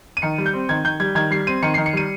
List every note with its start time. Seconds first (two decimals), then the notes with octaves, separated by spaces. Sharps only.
0.17 D#7
0.22 D#3 C#7
0.38 G3
0.46 G6
0.53 C4
0.69 D#3 G#6
0.84 D#3 G6
1.00 G3 G#6
1.15 D#3 G#6
1.31 G3 C7
1.47 C4 D#7
1.63 D#3 C#7
1.74 D#3 C7
1.86 C#7
1.93 G3 D#7